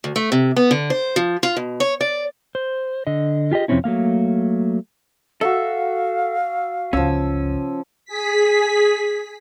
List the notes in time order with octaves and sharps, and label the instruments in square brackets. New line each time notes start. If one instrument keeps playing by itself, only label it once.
[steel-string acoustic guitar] D2
A3
C3
B3
D3
C5
F3
F4
B2
C#5
D5
[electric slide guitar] C5
D3 D#5
F4 G4 G#4 D#5
F2 C3 D#3 C4 C#4 E4
F#3 A3 A#3 F5
[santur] F#4 E5 [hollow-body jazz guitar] A4 [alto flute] F5
[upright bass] G1 C#2 [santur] F3 E6 [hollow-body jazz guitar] C#4
[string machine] G#4 B6